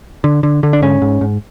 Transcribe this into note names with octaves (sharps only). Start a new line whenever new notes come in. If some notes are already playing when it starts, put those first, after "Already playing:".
D3
D3
D3
D4
G#2 C#4
G#2
G#2